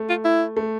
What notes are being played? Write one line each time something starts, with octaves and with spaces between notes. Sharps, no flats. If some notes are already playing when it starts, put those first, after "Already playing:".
Already playing: A3
F4
E4
A3